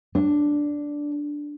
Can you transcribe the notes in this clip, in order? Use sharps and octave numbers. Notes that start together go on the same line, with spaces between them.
D4